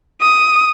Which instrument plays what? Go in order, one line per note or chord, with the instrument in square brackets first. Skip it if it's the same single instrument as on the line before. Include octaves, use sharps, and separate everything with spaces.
[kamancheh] D#6